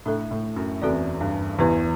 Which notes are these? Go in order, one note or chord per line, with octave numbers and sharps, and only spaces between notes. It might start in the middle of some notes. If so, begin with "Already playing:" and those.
A2 D4 A4 E5
A2
F#2
E2 C4 F#4 A4 D5
G2
E2 E3 B3 E4 G4 B4